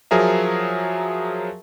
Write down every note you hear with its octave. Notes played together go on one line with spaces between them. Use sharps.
F3 F#3 G#4 A#4 E5